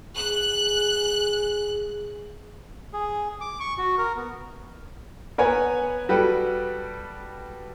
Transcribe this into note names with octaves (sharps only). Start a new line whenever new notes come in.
G#4 F#6
G#4
D6
C#6
F#4
A#4
B3
B3 A#4 B4 C#5 F#5 G#5
G3 F#4 A4 B4 G5